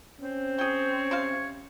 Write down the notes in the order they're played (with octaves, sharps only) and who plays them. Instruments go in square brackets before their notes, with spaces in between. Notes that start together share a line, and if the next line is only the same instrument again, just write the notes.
[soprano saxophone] C4 [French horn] C#4
[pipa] G#4 G5 [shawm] C#5
[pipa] C3 C5 F5